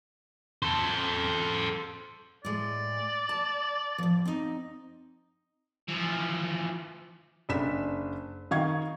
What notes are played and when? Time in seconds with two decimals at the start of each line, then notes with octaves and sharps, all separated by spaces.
0.62 A4 C5
2.45 A2 G#3 D5
3.29 A5
3.98 A2 F3
4.25 C4 D#4
5.89 E3 F3
7.49 F#1 D4 B6 E7
8.51 D#3 D#5 F5 C#6 G#6